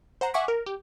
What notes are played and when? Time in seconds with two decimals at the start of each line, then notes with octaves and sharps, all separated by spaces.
0.21 C5 F#5 A#5
0.34 E5 F#5 G#5 C#6 D6 B6
0.48 A#4
0.66 G4